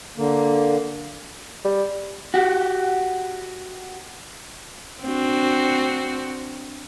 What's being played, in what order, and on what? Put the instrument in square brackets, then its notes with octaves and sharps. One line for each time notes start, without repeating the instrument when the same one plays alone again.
[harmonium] D3 A#3
[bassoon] G3
[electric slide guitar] F#4 G4
[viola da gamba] C4 D4 F#4